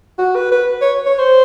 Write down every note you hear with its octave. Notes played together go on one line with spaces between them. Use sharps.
F#4
B4
B4
C#5
C#5
C5